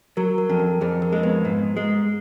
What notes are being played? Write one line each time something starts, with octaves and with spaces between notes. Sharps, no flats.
F#3 A#4
A#4
F2
A#4
F2 G#4
A#4
G#3
B3 B4
G#2
G#3